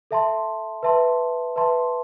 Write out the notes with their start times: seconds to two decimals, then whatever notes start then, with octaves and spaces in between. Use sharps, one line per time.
0.11 A4 E5 A5 C6
0.83 B4 E5 A5 C6
1.56 B4 E5 A5 C6